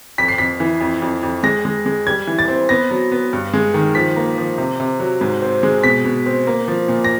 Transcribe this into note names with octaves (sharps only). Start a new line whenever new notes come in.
F2 B6
C7
F2 B6
E3
F2
F2
F2
G#3 A#6
G#3
G#3
G3 G#6
E3
A6
C4
B3 A#6
F#3
B3
G2
G#3
D#3
F3 B6
A#3
F3
C3
C3
F#3
G#2
C4
G#3
B2 B6
B2
C4
A#3
F3
A#2
A#6